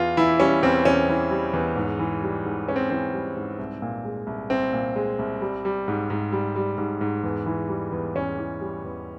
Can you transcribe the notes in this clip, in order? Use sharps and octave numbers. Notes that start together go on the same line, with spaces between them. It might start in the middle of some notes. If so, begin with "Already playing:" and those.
Already playing: E2 F4
E3 E4
G3 C#4
E2 C4
E2 C#4
E3
G3
E2
G#2
E3
G3
G#2
G#2 C#4
C4
E3 C4
G3
G#2
C2
A#2
G#3
C2
C2 C4
A#2
G#3
C2
G3
G3
G#2
G#2
G3
G3
G#2
G#2
E2
E3
G3
E2
E2 C#4
E3
G3
E2